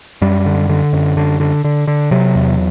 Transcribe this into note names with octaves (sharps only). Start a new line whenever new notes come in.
F#2 G3
D3
D3
F#2
D3
D3
D3
D3
C3 F#3
E2